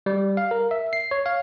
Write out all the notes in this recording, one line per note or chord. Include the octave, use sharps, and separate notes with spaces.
G3
F5
A#4
E5
C7
C#5
F5